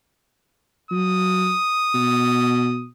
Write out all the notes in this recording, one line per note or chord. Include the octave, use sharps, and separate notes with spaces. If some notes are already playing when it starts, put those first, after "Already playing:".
F#3 D#6
B2